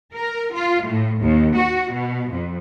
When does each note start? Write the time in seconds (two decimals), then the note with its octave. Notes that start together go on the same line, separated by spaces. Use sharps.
0.13 A#4
0.54 F4
0.85 A2
1.20 D#2
1.55 F#4
1.91 B2
2.30 F2